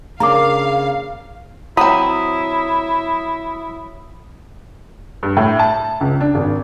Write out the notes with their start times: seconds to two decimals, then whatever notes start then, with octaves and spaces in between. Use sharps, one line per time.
0.20 C#3 A#3 D4 F5 A#5 D6
1.77 F#3 C4 E4 B5 D#6
5.23 G2
5.37 A2
5.59 A5
6.01 C#2
6.21 D4
6.35 G#1